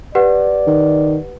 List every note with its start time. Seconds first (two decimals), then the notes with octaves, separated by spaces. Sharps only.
0.15 G4 B4 D5 F#5
0.67 D#3